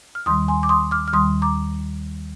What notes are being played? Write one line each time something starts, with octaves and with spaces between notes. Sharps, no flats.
F6
D#2 D#3 G3 C6 D#6
G#5 C6
D6
C6 D#6
D6 F6
F6
D#2 D#3 G3 C6 D#6
A#5 D6